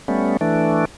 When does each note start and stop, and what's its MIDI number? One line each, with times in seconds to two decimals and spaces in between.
0.08 0.37 55
0.08 0.37 57
0.08 0.37 59
0.08 0.37 61
0.41 0.85 52
0.41 0.85 57
0.41 0.85 62